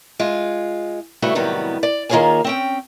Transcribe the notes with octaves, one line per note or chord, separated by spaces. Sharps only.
G#3 F4
C#3 G3 A3 B3 E4 F#4
A2 C3 D#3 F#3 G3 B3
D5
D#3 A#3 F4 G#4 C#5 G#5
C4 C#4 G5